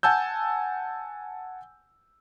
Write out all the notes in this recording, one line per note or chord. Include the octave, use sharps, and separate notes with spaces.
F#5 G#5 A5 E6 G6